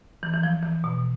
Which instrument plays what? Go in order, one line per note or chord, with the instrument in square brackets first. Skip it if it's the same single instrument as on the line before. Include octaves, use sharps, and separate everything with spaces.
[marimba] E3
E3
F3
E3
B2